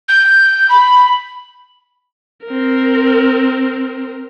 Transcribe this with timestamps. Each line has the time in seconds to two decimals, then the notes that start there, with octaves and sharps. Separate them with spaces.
0.08 G6
0.69 B5
2.46 C4 A#4